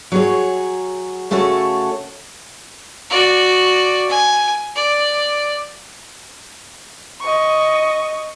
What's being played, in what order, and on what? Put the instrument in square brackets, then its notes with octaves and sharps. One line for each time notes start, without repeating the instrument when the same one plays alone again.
[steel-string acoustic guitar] F#3 G#4 C#5
C#3 A3 F#4 A4 C#5
[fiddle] F#4 D5
G#5
D5
[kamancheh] D#5 C#6